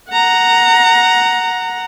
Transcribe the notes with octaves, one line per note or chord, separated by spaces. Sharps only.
F#5 A#5